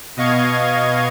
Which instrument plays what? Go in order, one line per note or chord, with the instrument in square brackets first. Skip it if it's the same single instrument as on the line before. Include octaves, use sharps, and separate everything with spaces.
[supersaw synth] B2 D#5 F5 C#6 G#6